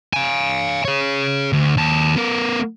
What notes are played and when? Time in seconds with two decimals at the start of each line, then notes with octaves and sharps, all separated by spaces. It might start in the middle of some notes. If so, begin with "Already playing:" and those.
0.13 F5 G#5
0.85 G#4 C#5
1.53 D2
1.77 D#2 A5
2.16 B3 A#4